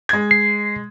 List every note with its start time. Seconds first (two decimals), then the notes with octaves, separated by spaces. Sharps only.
0.09 G#3 G#6
0.31 C7